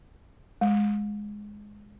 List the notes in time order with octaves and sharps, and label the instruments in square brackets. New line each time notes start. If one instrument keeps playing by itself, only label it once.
[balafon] G#3